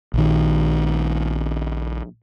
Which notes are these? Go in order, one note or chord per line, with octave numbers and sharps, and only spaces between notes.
A#1 D#3